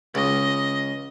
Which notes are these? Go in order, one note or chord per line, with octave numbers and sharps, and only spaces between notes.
C#2 D#5